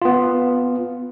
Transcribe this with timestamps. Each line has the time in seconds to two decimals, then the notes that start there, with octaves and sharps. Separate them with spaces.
0.02 B3 F4